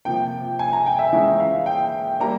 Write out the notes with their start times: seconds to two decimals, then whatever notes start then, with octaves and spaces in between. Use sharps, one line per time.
0.05 C3 F3 A#3 G5
0.59 G#5
0.73 A#5
0.86 G5
0.99 E5
1.13 E3 G#3 C#4 E4 E5
1.40 F5
1.66 G5
2.20 G3 A#3 A#5